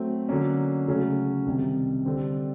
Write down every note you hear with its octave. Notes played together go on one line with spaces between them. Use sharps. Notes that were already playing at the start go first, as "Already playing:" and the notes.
Already playing: F#3 A3 C4
D3 F#3 A#3 C#4
C#3 F#3 A3 C#4
C2 C3 D#3
D3 G3 C4